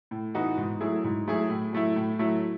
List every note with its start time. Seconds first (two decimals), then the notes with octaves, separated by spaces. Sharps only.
0.11 A2
0.34 E3 B3 D#4 F#4
0.57 G#2
0.80 F#3 A3 E4 G#4
1.04 G#2
1.27 F#3 A3 E4 G#4
1.50 A2
1.73 F#3 A3 E4
1.96 A2
2.19 F#3 A3 E4